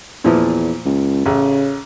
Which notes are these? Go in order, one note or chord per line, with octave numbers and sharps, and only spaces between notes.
E2 A#2 E3 F3
C#2
A1 C#3